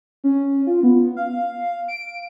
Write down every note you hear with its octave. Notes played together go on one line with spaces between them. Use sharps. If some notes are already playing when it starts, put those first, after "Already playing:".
C#4
F4
B3
F5
D7